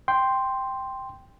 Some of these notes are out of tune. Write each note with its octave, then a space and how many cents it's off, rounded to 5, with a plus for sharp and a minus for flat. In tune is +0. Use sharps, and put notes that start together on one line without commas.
G5 +0 C6 +0